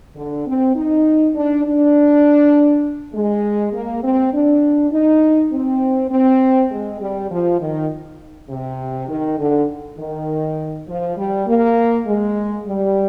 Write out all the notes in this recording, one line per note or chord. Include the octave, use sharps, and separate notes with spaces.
D3
C4
D#4
D4
D4
G#3
A#3
C4
D4
D#4
C4
C4
G#3
G3
F3
D#3
C3
D#3
D3
D#3
F3
G3
A#3
G#3
G3